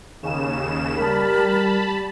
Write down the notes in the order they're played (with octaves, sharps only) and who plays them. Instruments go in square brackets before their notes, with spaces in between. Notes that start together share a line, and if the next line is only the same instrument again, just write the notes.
[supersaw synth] D#2 C#3 E7
[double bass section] G3 [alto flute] A#4 [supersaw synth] A5 B5